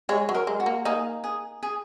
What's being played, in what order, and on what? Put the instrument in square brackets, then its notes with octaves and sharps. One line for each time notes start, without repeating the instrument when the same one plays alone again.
[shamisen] G#3 [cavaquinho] C#5
[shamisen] F#3
[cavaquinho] A#4
[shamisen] G#3
[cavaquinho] F#4
[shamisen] A#3
[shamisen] A#3 D#4 [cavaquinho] G#4
[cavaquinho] G#4
G#4